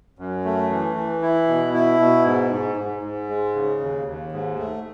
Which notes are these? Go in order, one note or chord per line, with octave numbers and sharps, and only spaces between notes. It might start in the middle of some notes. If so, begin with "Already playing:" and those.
F#2
A3
E3
E3
E4
B2
E4
B2
G#2
G#2
G#2
G#2
G#3
C#3
D#2
D#2
G#2
A3